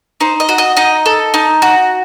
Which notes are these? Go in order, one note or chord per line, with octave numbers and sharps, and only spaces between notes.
D#4 C5
D#5
F#4
D#5
D#4 D#5
A4
D#4
F#4